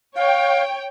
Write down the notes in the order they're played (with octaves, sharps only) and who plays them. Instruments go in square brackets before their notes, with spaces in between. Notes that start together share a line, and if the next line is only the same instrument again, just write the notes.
[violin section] C#5 G5 [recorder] F5